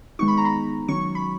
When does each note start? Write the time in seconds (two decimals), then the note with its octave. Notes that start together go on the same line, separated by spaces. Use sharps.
0.19 D#3 G#3 B3 D#4 C#6
0.28 B5
0.37 A#5
0.45 B5
0.88 D#3 F#3 C#4 C#6
1.15 B5